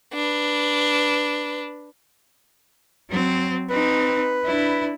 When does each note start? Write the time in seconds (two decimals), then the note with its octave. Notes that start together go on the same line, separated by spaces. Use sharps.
0.13 D4 B4
3.10 F#3 C4
3.70 C4 D#4 B4
4.46 D4 E4